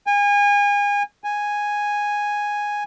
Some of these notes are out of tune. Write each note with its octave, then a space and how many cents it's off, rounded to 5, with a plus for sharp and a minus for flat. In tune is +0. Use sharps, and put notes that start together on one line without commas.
G#5 -30
G#5 -5